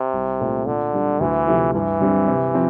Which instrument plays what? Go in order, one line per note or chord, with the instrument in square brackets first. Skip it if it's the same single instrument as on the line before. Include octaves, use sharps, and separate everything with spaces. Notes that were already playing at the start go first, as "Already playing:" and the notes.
Already playing: [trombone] C3
[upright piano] C2
A#2 A3 C4
[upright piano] A#2 [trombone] D3
[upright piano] G3 D4
[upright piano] D2 [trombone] E3
[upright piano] C3 F3 A3 E4
[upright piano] G2 [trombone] E3
[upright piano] D3 G3 C4
C3
F3 C4